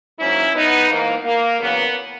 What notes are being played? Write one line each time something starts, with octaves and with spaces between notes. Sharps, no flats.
G#2 F#3 A#3 C#4 E4
B3 D#4
G#2 E3 A#3
A#3
E2 C#3 F#3 A#3 B3